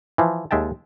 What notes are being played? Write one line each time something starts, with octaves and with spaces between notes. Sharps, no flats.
E3 F3
D#2 G#3 E5 G5 A5